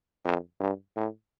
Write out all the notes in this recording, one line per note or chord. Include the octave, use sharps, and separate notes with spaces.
F2
G2
A2